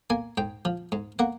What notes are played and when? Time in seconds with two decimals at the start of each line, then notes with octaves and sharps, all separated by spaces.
0.10 A#3 G#5
0.38 G#2 G5
0.65 F3
0.92 G#2
1.19 A#3 F#5